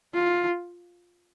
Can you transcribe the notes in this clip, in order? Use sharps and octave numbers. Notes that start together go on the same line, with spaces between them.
F4